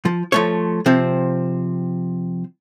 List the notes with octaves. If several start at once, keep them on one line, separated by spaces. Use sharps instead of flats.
F3
F3 A3 C#5
C3 F3 C4